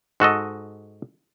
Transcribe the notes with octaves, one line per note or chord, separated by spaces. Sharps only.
G#2 F#4 A4 D#5